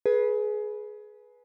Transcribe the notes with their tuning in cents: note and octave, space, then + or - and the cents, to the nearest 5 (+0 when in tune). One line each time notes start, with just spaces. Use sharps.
G#4 +25 B4 -10